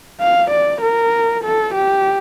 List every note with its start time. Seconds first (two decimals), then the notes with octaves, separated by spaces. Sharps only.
0.21 F5
0.51 D5
0.82 A#4
1.44 A4
1.75 G4